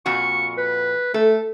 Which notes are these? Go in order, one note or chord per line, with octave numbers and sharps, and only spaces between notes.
F2 A#2 F#4 C#6
B4
A3 A4